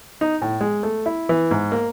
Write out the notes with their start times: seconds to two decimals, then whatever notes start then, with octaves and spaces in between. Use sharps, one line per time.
0.21 D#4
0.42 A2
0.61 G#3
0.83 A3
1.06 E4
1.29 E3
1.51 G#2
1.72 A#3